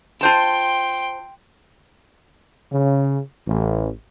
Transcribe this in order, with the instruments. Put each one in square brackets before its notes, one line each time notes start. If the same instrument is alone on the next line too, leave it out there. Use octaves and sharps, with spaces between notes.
[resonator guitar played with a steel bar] F4 C5 A5 [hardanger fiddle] G5 C6
[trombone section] C#3
A1